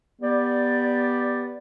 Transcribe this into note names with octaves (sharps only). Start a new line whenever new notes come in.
B3 G4 D5